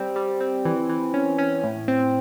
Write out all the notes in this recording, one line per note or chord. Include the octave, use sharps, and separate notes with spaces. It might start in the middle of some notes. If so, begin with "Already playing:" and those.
Already playing: G3 C4
G3
C4
E3
E3
C#4
C#4
A2
C4